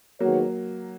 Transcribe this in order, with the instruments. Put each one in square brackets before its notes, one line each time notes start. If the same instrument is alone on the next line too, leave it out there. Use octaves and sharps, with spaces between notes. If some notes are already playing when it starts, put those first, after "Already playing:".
[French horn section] D#3 G#3 B3 F#4 C#5 [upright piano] F#3 A#3